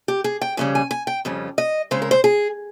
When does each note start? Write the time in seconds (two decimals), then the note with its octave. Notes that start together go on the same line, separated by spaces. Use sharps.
0.08 G4
0.24 G#4
0.42 G5
0.57 F2 C#3 G3 C#4 G#5
0.75 G#5
0.91 G#5
1.07 G5
1.25 F2 C#3 G3 C#4
1.58 D#5
1.91 C#3 G#3 C4 C5
2.02 A#4
2.11 C5
2.24 G#4